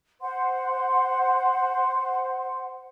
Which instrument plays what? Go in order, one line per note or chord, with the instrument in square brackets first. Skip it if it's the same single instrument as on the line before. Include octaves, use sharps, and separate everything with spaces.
[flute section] C5 F#5 C6